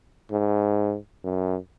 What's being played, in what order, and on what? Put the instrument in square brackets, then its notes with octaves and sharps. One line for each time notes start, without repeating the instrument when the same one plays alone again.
[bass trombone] G#2
F#2